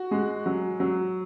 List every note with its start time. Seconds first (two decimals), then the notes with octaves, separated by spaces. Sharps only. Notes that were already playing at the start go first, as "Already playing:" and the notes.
Already playing: F#4
0.11 G#3
0.46 F#3
0.80 F#3